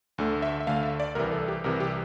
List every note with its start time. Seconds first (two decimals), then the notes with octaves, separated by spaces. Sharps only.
0.18 D2 D3 A3
0.42 E5
0.60 E5
0.67 D2 D3 A3 F5
0.83 E5
1.00 D5
1.15 C2 C3 E3 A#4
1.32 A4
1.48 G4
1.64 C2 C3 E3 A#4
1.80 G4